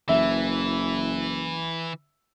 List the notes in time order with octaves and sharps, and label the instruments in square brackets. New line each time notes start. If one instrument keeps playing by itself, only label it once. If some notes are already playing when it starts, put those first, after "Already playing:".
[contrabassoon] F#1 [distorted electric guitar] E3 [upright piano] E5